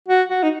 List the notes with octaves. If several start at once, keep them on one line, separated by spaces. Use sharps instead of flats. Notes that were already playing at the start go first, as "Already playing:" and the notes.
F#4
F#4
D#4